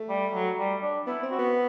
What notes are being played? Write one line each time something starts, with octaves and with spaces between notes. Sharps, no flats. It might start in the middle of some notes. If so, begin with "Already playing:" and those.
Already playing: A3
G3
F#3
G3
D4
B3 E4
C4
F#4
B3